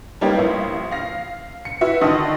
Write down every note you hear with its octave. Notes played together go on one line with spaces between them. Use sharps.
G3 A#3 D#4 G4 B4 C#5
A#1 E4 F5
F5 A#6
C#7
E4 F#4 B4 E5
D3 D#3 D#5 D#6